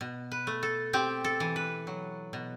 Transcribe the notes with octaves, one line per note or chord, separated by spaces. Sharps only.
B2
B4
A3
A4
C4 G4
A4
E3
B4
F#3
B2